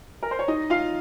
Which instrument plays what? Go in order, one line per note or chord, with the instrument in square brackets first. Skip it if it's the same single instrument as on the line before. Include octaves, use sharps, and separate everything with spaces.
[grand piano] A#4
C5
C#5
D#4 D#5
F4 F5